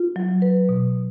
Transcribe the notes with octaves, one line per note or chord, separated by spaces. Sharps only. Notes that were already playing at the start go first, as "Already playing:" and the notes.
Already playing: F4
F#3
B4
B2